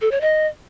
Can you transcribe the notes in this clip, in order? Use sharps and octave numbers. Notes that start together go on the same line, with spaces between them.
A4
C#5
D#5